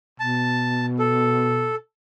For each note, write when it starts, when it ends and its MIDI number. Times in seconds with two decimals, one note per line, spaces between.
0.20 1.74 47
0.20 0.86 81
0.99 1.75 69